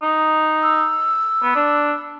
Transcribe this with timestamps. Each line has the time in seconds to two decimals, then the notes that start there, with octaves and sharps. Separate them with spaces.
0.02 D#4
0.63 E6
1.42 B3
1.55 D4